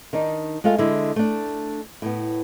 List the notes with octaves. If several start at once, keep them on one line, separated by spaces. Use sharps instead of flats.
D#3 D4 D#4
G#3 A3 F4 A4 F5
D3 G#3 E4
A3 D4
A2 B3